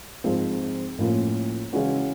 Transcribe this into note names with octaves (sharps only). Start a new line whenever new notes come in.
G#2 F3 G#3 C4
A2 F3 A#3 C#4 F4
C#3 E3 G#3 C#4 F#4